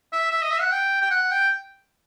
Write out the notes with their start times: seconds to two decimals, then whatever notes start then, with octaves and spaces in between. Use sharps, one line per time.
0.12 E5
0.31 E5
0.42 D#5
0.51 E5
0.61 F#5
0.72 G5
1.01 G5
1.11 F#5
1.31 G5